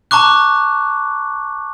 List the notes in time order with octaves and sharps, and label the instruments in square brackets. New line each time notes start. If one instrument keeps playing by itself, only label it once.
[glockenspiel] A5 A#5 C#6 D6 F#6